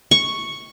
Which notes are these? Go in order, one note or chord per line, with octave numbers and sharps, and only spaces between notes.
C#6